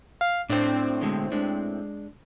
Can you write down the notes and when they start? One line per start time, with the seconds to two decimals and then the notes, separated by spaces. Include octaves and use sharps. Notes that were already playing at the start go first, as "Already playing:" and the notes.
0.21 F5
0.50 A2 C4 D4
1.01 B2 D3 G#3
1.32 G#3 D4